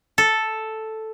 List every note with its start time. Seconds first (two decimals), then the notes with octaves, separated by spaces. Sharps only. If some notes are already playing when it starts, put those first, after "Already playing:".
0.18 A4